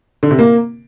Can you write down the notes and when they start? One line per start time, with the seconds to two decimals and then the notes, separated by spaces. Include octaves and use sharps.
0.23 D3
0.31 C3
0.39 A#3